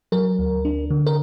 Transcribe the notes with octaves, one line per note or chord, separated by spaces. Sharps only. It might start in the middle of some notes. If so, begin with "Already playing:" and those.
F#3 A#4
D2
D4
D3
A#4